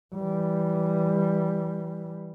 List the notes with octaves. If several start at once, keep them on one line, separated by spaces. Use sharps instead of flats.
E3 G3